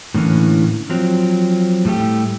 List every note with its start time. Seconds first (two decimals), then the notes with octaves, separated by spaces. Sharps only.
0.14 A2 D3 E3 A#3 C4 C#4
0.90 F3 F#3 C4
1.85 A2 G3 A3 G4